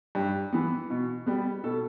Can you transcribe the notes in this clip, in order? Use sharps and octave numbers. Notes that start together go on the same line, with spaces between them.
G2
E3 B3
B2
G3 B3
B2 A4